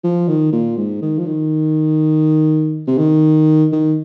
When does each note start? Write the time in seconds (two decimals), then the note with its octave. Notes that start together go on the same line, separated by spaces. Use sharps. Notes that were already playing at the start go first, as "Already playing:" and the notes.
0.04 F3
0.28 D#3
0.53 A#2
0.77 G#2
1.02 D#3
1.18 F3
1.26 D#3
2.87 C3
2.98 D#3
3.72 D#3